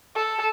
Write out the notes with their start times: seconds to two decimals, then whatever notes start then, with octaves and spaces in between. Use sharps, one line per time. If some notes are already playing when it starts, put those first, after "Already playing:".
0.16 A4